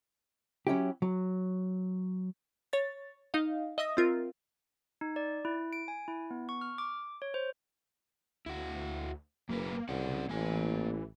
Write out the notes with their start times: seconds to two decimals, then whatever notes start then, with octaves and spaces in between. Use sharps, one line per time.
0.67 F#3 C#4 E4 G4
1.02 F#3
2.73 C#5 A6
3.34 D#4 D#5 F5
3.78 D#5 E5 D#6 A#6
3.97 C4 F4 A#4
5.01 D#4
5.16 D5
5.45 E4
5.73 D7
5.88 G#5
6.08 E4
6.31 B3
6.49 C#6
6.61 F6
6.78 D6
7.22 C#5
7.34 C5
8.46 D2 E4 F#4
9.49 F#1 F#2 F#3 A#3 B4
9.89 C2 C#3 C#4 D5 F#5
10.29 A1 E3 A#3 G#5